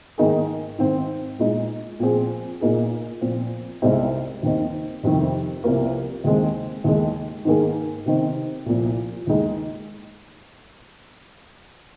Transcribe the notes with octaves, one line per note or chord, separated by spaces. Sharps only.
G#2 D#3 A#3 D#4 G#4
G#2 D#3 C4
A#2 G#3 D#4
A#2 F3 C4 G#4
A#2 A#3 D#4 G#4
A#2 F3 C4
C2 C3 G#3 C4 D#4
D#2 D#3 C4 D#4
F2 C3 D#3
C2 C3 F3 A#3
D#2 D#3 G#3 C4
D#2 D#3 G#3
G#2 D#3 A#3 G#4
C3 D#3 C4 D#4
C2 A#2 F3
D#2 D#3 G#3 D#4